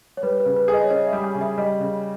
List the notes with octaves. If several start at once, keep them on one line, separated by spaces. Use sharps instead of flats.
C#5
G3 B4
B4
C#3
B4
G#4
D#5
C#5
C#4 D#5
E5
G3
G#5
C#3
E5
G3 D#5
C#3